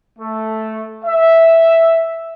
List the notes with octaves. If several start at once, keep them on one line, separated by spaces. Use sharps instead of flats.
A3
E5